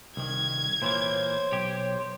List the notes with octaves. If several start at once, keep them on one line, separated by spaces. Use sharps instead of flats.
C2 D#3 G#6
A#2 E3 A#3 C5 C#5
B1 G4